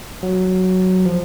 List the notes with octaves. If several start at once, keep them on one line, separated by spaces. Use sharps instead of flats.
F#3
F3